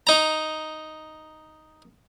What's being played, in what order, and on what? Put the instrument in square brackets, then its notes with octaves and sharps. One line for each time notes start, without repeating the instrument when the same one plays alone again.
[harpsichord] D#4 A#5